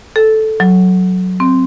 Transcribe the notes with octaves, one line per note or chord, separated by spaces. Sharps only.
A4
F#3
C4